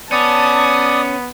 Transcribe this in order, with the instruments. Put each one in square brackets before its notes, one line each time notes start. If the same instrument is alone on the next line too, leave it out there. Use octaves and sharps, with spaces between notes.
[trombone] B3 [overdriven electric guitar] C#4 [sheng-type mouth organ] D5 D#6 [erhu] A5